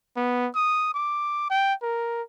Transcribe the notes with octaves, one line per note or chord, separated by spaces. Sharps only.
B3
D#6
D6
G5
A#4